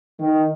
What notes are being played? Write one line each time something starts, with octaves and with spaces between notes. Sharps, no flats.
D#3